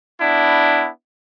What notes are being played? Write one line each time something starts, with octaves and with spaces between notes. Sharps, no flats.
B3 D4 E4